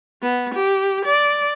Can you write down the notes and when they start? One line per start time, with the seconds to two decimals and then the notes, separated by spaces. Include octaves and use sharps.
0.23 B3
0.54 G4
1.05 D5